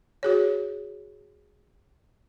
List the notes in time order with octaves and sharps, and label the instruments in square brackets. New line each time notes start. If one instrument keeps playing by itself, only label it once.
[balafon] F#4 G#4 C#5